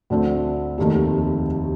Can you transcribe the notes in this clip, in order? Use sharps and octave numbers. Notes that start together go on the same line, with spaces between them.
D2 D3 A3 C4
F1 D#2 D#3 A3